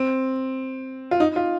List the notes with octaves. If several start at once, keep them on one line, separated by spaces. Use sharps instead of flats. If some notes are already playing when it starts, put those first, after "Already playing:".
Already playing: C4
F4
D#4
F4